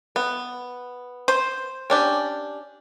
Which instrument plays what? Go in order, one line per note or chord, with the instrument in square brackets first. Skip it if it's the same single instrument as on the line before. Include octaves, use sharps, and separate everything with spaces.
[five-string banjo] B3
[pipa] C5
[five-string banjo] C#4 D4 G4